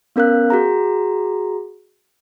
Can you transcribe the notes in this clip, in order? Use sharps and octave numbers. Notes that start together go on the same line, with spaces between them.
B3 C#4 A#4 F5 F#6
F#4 G#4 A#5